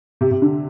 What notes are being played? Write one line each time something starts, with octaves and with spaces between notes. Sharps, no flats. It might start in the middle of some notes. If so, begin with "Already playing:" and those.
C3
C3
D3